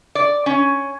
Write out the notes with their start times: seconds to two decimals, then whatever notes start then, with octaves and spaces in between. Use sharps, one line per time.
0.15 D5
0.46 C#4